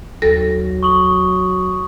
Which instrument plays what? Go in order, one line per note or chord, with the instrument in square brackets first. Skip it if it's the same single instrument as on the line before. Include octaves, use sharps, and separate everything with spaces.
[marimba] D#2 A4 A#6 [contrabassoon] F#3
[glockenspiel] C#6 D#6 F#7